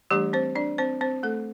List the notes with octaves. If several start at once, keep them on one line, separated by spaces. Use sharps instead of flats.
E3 G3 A3 D4 G4
C4 C5
D4 D5
C4 C5
C4 C5
A3 A4